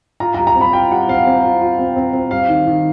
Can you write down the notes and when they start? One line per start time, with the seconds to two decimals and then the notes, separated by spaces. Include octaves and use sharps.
0.20 F4 A#5
0.34 A#5
0.38 G3
0.47 A#5
0.55 C4
0.61 B5
0.73 F4 G5
0.90 G3 F#5
1.08 C4 F5
1.27 C4
1.44 F4
1.61 F4
1.79 C4
1.96 C4
2.13 C4
2.31 G3 F5
2.48 D#3
2.67 D#3